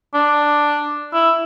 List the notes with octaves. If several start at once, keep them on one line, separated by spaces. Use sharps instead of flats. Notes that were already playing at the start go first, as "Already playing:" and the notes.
D4
E4